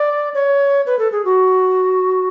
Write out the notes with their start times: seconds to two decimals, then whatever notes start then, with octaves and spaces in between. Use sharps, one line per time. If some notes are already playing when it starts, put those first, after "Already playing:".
Already playing: D5
0.34 C#5
0.86 B4
0.99 A4
1.12 G#4
1.25 F#4